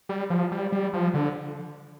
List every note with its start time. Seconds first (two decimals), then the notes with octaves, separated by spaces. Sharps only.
0.09 G3
0.30 F3
0.52 G3
0.72 G3
0.93 F3
1.14 D3